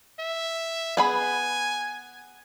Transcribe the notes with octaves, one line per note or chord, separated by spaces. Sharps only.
E5
B3 G#4 G#5 B5